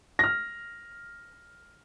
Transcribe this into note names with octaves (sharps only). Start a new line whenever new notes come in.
F6 A#6